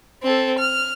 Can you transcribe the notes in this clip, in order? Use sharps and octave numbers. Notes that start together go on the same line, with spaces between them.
C4 A4
F6